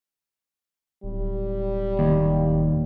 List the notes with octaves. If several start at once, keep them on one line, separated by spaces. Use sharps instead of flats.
D1 G3
D#2